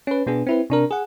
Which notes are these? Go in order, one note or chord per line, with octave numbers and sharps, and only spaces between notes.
C#4 B4
B2 B3 D4 G#4
C4 E4 B4
C3 D4 A#4
G#4 F#5